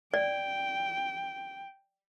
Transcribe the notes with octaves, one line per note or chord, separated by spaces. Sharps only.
D5 G5